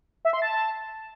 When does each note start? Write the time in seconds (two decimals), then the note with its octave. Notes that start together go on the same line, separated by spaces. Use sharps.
0.25 E5
0.33 C6
0.42 A5